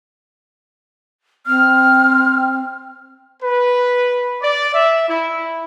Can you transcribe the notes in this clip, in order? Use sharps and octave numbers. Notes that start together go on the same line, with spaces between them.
C4 F6
B4
D5
E5
E4